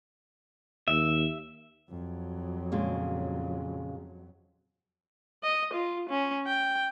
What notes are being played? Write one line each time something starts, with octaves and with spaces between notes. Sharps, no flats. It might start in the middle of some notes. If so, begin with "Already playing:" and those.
D#2 E5
F2 F#3
A#2 C#3 G#3
D#5
F4
C#4
G5